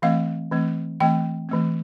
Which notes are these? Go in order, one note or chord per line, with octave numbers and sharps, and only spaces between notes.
E3 A3 C4 F5
E3 A3 C4
E3 A3 C4 G5
E3 A3 C4